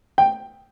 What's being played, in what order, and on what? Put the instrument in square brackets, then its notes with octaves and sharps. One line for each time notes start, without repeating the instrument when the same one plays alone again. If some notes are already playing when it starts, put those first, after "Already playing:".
[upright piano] G5